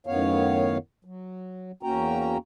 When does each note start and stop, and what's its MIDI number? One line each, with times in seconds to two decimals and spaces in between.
0.07 0.78 42
0.07 0.78 45
0.07 0.78 51
0.07 0.78 59
0.07 0.78 73
0.07 0.78 77
1.05 1.72 54
1.83 2.38 40
1.83 2.38 58
1.83 2.38 61
1.83 2.38 66
1.83 2.38 79
1.83 2.38 82